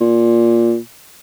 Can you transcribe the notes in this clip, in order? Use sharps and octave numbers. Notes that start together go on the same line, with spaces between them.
A#2